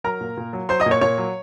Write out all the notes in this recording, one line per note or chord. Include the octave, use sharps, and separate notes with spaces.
F#3 A#4 A#5
A#2
A#2
F#3
F#3 C5 C6
D#5 D#6
A#2
C#5 C#6
A#2 C#5 C#6
F#3